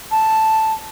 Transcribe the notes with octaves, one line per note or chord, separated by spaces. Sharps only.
A5